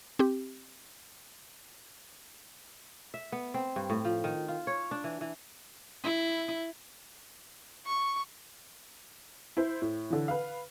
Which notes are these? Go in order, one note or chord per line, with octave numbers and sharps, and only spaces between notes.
C4 G4
E5
B3
C4
G2
A2
F3
D#3
F4
C#5
D4
E3
E3
E4
C#6
E4 C5
A2
D3 E3
B4 F5